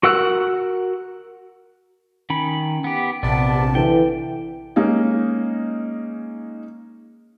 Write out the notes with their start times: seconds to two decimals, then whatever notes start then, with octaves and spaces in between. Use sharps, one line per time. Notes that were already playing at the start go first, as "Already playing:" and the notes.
0.03 F#4 A#4 F#5 E6 F#6
2.30 D#3 C#4 B5
2.84 B3 G4
3.23 A#1 C3 B3 D5 A5
3.75 D3 E3 G5
4.76 G#3 A#3 C#4 D#4